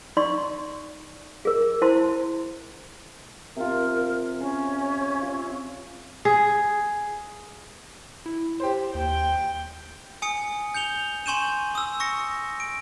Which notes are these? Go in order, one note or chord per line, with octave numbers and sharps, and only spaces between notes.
D#4 D5 C6 C#6
G#4 A#4
E4 C5 A5 C6
C3 F4 A#4
C#4 G#4
F4 E5
G#4
E4
G4 C5
D#2 G5
G#5 D#6 C#7
G6 C#7 F7 G7
G#5 C6 C#6 G6 D#7 E7
D#6 E6
C#6 A#6 C#7
D7